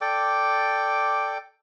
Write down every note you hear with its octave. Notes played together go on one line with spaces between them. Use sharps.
A4 D5 G5 D6